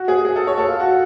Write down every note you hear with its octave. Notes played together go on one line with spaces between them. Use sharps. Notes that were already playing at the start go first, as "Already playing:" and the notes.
Already playing: F#4
G#4
G#4
A4
C#5
A4
F4
F#4